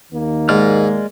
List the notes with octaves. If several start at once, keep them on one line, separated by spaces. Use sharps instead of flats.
D#2 D#3 A#3
G#2 G#3 D5 F6